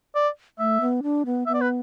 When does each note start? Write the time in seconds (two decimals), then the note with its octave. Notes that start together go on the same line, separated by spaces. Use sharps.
0.15 D5
0.59 A3 E5
0.81 B3
1.03 D4
1.26 B3
1.46 B3 E5
1.54 D5
1.61 B4